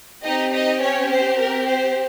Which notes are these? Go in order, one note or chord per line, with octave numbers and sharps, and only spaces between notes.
C4 D#4 G4 D#5
D#4 D#5
C#4 C#5
C5
A#4
C5